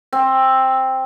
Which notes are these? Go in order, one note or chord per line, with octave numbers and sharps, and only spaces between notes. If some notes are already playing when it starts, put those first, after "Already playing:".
C4